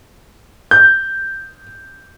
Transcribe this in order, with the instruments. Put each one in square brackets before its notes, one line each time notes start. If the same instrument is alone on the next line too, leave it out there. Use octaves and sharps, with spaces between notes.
[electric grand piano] G6